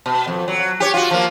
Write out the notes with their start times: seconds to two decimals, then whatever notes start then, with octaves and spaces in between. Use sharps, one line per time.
0.06 B2
0.28 F2
0.48 F#3
0.80 G4 C#5
0.94 F4 F#4
1.11 F3 A#3